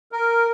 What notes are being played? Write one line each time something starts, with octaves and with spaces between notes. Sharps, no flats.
A#4